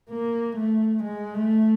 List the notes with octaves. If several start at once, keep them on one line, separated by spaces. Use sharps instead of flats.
A#3
A3
G#3
A3